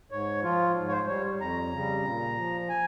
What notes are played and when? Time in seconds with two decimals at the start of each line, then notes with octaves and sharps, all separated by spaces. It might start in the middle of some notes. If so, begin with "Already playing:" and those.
0.11 G#2 C#5
0.43 F3 F4
0.76 G#2
0.88 C#5
0.92 C5
1.08 G3 C#5
1.40 F2 A#5
1.73 C#3 G3
2.04 A#2
2.37 F3
2.69 G#5